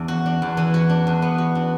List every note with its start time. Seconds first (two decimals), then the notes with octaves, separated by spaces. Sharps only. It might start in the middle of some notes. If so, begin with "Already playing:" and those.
Already playing: E2 D4
0.08 F#4
0.26 D4
0.42 E2
0.57 E3
0.74 F#4
0.89 D4
1.07 E2
1.22 B3
1.38 F#4
1.55 D4